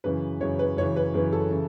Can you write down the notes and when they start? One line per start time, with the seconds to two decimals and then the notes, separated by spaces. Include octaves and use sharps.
0.04 F#2 C#3 E3 B4
0.40 F#2 C#3 E3 C#5
0.59 B4
0.77 F#2 C#3 E3 C#5
0.96 B4
1.14 F#2 C#3 E3 B4
1.32 A4
1.51 C#3 E3